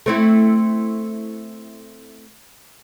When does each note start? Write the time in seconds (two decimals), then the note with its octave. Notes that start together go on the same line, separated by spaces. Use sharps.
0.06 A3 C4 E4